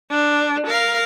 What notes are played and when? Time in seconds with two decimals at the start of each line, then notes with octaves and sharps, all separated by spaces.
0.11 D4
0.67 A#4 F5